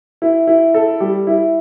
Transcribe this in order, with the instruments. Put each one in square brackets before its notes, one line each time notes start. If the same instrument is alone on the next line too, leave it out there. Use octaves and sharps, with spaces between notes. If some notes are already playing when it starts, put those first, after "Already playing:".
[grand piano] E4
E4
A4
G3
E4